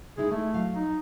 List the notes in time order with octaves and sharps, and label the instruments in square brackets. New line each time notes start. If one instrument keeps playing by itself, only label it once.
[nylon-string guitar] G#3 D#4 E4 [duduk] G#4
[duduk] A3 [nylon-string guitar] D#4 E4
[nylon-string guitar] F#3 F5
[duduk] D#4